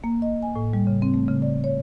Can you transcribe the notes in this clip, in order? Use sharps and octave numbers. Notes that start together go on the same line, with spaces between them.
A#3
D#5
G#5
A2
G3
C#3
C4
A3
C#3
D5
C#5